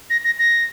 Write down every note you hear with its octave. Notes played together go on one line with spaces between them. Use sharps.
A#6
A#6
A#6